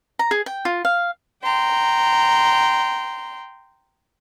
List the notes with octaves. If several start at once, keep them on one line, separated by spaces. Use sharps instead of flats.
A#5
G#4
G5
F4
F5
G5 A#5 C6